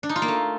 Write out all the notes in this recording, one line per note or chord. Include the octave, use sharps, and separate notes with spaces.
D4
D#4
F4
A#3
A3